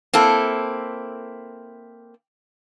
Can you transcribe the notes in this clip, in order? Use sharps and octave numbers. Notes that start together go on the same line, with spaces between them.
A#3 C4 E4 A4